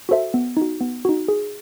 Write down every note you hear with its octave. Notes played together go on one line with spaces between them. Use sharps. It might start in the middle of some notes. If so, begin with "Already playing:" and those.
F#4 A4 C5 E5
B3
D#4 F#4
B3
D#4 F#4
G#4